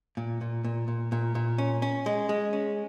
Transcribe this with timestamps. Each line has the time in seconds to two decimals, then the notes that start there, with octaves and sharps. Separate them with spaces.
0.17 A#2
0.41 A#2
0.64 A#2
0.88 A#2
1.12 A#2
1.35 A#2
1.58 C#4
1.82 C#4
2.06 G#3
2.29 G#3
2.53 C#4